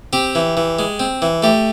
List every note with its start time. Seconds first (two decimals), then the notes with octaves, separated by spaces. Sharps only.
0.13 C4 G4
0.35 E3
0.57 E3
0.79 G#3
1.00 C4
1.22 E3
1.43 A3 G4